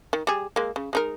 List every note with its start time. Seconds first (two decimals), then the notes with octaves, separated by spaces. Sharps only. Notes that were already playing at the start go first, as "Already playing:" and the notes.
0.13 D#3
0.27 G3 G#4
0.56 G#3 A#3
0.76 C#3
0.93 G#3 D#4 A#4